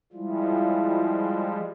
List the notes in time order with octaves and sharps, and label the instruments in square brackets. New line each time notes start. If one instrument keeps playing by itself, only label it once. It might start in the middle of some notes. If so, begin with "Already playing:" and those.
[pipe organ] F3 G3 G#3 [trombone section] E4 F4